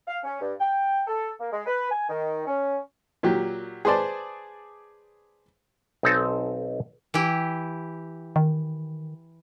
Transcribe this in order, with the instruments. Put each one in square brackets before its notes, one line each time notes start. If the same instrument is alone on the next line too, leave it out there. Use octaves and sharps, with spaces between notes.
[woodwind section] F5
C#4
G2
G5
A4
A#3
G#3
B4
G#5
D#3
C#4
[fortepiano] A#2 F#3 G4
G#4 B4 C5 D5 A5
[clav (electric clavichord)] B1 C4 D#4 A4 G#5
[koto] E3 E4 G4
[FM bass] D#3